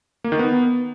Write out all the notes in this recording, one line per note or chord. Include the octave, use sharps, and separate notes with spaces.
A#3
D#3
B3